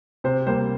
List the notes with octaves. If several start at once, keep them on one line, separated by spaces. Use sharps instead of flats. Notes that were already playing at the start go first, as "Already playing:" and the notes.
C3 C5
G3 A#3 C5